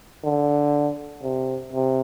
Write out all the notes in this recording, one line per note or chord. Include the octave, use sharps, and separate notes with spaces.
D3
C3
C3